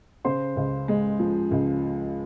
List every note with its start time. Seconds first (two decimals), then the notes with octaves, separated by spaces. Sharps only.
0.25 C#3 C5 C6
0.56 C#2
0.88 G#3
1.19 F3
1.51 C#2